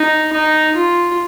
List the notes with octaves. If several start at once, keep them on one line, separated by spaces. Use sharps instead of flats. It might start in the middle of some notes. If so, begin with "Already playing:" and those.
Already playing: D#4
D#4
F4